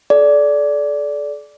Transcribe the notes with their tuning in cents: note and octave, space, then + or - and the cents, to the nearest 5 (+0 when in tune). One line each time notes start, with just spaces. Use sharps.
A4 -40 D5 -15